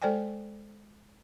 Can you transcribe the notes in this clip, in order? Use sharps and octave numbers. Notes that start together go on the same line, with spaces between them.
G#3 A4 C5 D5 G5 G#5